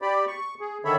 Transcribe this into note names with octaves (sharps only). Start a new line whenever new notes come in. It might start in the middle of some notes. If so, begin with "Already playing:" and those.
G4 D5 B5
C#6
G#4
D3 D#3 A4 C#5 E5 B5